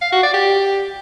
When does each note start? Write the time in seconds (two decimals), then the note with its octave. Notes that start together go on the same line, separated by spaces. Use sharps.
0.02 F5
0.12 F#4
0.23 D5
0.34 G4